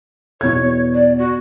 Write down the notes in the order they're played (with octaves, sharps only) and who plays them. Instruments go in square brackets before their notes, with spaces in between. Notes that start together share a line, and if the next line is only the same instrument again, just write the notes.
[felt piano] E2 B2 G#6 [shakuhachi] C#5
[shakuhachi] D5
F#4